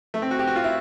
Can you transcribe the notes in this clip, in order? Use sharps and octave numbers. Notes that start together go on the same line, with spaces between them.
A3
C4
F#4
G4
F#4
F4
E4